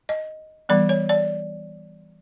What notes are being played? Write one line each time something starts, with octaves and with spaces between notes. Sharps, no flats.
D#5
E3 G3 B3 D5
C#5
D5